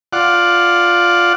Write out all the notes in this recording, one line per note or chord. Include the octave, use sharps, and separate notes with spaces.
F4 D5 F#5